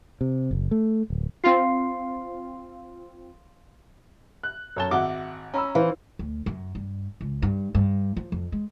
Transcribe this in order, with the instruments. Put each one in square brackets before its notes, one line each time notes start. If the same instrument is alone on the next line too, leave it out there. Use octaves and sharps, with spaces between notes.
[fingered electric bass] C3
F#1
A3
D1
[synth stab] C4 F4 [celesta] F5 C6 C7
[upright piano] F#6
[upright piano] F#2 G7 [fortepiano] A4 C#5 A5
[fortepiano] G#1 F#4 D6 [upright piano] E5 F#5
[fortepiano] C#4 [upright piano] A#5 B5 E6
[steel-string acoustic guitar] E3 [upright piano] C5 F5
[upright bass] D2
F#2
G2
C#2
G2
G2
F3
F2
G#3